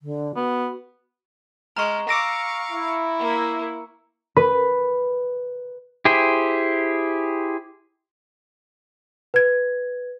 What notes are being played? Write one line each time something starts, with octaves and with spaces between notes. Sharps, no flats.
D3
B3 F#4
G#3 A#5 C#6 F6
F5 A#5 C#6 D6 E6 A#6 C#7
E4
A#3
B4
E4 G4 G#4 C5
B4 G#6